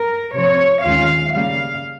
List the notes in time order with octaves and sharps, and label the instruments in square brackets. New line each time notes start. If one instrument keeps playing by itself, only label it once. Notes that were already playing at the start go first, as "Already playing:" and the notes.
Already playing: [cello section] A#4
C3 F3 C4 C#5
D#2 D#3 G#3 C#4 F4 F5
C#3 G3 A#3 F5